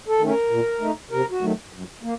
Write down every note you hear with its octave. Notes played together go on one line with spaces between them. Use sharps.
A4
D#3 A3 C#4
A#4
A#2
A3 D#4
C3 A#4
F#4
D#3 F#3 A3
F#2
A#3